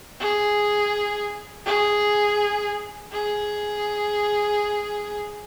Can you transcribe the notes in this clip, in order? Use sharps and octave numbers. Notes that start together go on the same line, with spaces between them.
G#4
G#4
G#4